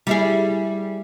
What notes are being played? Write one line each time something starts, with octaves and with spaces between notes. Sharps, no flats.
G3 E4 G#4